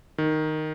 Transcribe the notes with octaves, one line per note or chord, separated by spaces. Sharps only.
D#3